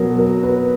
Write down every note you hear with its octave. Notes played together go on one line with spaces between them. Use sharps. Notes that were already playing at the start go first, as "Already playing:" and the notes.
Already playing: B2 F#3 F#4 A#4
A#4
B4